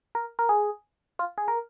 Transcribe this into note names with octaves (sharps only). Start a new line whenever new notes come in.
A#4
A#4
G#4
F4
G#4
A#4